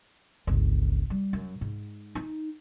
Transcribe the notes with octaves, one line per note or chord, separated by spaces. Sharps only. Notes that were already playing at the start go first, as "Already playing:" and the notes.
G1 C#2
G3
F#2
G#2
D#4